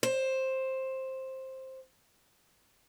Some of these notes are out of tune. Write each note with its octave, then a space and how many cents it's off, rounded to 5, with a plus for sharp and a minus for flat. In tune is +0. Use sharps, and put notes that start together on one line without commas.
C5 +10